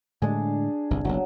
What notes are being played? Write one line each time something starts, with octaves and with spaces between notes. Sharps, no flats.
A2 D3 G#3 D4 G#4
G1 C2
F#1 B1 F#3